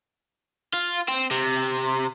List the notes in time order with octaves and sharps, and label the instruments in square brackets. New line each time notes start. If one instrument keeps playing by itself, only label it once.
[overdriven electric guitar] F4
C4
C3